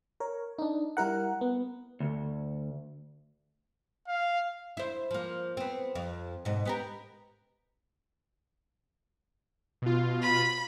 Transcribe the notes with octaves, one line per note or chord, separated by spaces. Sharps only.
A#4 C#5
D4 D#4
G3 E4 A#4 F#5
B3
D2
F5
E4 C5
F3 A#3
B3 C4
F2
G#2 B2
B3 G4 A#4
B2 F4
B5